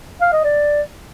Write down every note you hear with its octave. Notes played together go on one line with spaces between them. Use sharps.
F5
D#5
D5